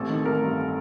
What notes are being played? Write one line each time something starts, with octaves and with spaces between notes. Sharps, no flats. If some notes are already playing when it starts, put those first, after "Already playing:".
Already playing: A1 C3 A4
D#3
A1 A#4
G2